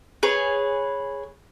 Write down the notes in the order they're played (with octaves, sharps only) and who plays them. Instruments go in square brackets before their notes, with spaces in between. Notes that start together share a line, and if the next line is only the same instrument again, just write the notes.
[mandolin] G#4 B4 C#5